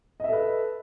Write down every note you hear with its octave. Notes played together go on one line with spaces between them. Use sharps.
A4 B4 D#5 E5